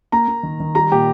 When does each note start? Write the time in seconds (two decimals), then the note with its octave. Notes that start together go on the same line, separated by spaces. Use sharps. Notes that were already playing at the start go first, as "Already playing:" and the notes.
0.12 A#3 A#5
0.28 A#3
0.43 D#3
0.60 D#3
0.75 G3 A#5
0.92 A#2 G4